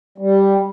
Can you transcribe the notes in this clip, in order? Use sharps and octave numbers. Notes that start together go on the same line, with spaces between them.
G3